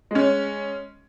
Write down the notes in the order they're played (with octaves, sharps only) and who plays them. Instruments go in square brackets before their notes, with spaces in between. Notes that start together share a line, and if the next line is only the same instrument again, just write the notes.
[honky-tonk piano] G#3 C#4